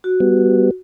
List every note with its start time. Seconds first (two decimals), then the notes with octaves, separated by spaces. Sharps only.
0.04 F#4
0.20 G3 B3